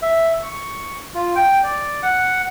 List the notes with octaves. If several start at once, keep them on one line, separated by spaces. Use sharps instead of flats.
E5
C#6
F4
G5
D5
F#5